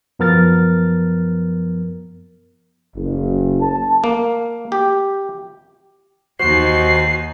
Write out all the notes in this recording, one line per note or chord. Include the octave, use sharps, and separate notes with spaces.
F#2 F3 B3 A#4 F6 A6
F#1
A5
A#3
G4
D#2 D#4 F#4 C5 C7